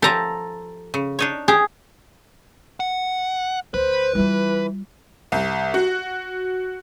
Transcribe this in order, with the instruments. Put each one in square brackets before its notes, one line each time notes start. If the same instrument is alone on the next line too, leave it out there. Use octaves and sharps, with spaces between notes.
[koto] F3 G4 [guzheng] A4 A#5
[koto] C#3
D4 D#4 C#5
[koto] G4 [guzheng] G#4
[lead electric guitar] F#5
[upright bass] D2 [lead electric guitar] B4 [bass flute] C5
[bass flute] E3 [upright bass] G3 F4
[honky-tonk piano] C2
F#4